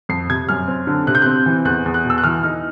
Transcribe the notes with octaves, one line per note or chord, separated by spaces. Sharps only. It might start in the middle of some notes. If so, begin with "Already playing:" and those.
F2 C7
C3 G#6
F#2 F6
C4
D3
C3 F#6
G6
C4 F#6
E3
E2 F#6
E2
F#6
B2
E6
F#6
E3 F6
D#4 F6